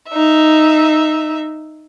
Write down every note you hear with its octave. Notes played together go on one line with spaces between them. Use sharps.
D#4 E5